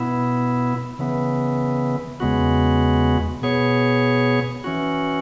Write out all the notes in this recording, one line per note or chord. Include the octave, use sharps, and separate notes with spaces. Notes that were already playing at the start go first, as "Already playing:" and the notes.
Already playing: B2 B3 E4
C#3 E3 B3
E2 C#3 G#3 B3 F#4
B2 B3 G#4 C#5
E3 C#4 F#4